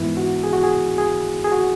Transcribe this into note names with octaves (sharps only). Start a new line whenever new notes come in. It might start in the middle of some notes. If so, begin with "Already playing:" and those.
Already playing: G#2 E3 B3 E4
F#4
G#4
F#4
G#4
G#4
G#4
F#4